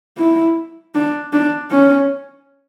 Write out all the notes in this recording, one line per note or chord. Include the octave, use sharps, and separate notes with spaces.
E4
D4
D4
C#4